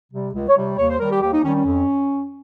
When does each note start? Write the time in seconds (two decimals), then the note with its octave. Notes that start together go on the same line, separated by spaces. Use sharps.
0.12 C3 G3
0.34 C#2
0.49 C#5
0.57 C3 G3
0.78 D#2 C#5
0.89 C5
1.00 D#3 G3 A#4
1.11 G4
1.22 D#2 G4
1.33 D#4
1.44 D#3 G3 C#4
1.55 C#4
1.66 F2